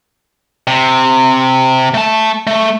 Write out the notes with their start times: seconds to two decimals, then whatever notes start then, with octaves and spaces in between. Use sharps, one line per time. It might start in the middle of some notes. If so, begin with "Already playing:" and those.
0.67 C3
1.94 A3 A5
2.47 A3